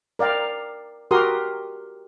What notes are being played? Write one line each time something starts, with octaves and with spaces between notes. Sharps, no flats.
A#4 D5 F5 G5
F#4 G4 A#4 C6 D#6